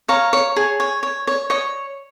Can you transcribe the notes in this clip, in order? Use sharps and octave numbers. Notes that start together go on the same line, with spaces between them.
C#5 F5 A#5
C#5
G#4
C#5
C#5
C#5
C#5 D#5